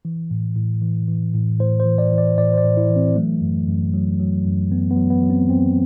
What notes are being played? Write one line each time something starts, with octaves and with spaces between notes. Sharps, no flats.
E3
A2
A2
E3
E3
A2
A2 C5
C5
E3
D5
E3
D5
A2 D5
C5
D5
A2
E4
E3
C4
F#3 A3
F#2
F#2
F#3
F#3
F#2
F#2 B3
B3
F#3
B3
F#3
C4
F#2 C4